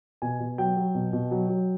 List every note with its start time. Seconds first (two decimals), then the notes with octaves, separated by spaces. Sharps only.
0.22 B2 G#5
0.40 B2
0.58 F#3 G5
0.77 F#3
0.95 B2
1.13 B2
1.31 F#3
1.49 F#3